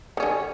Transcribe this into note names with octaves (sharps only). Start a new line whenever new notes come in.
D3 D#3 C#4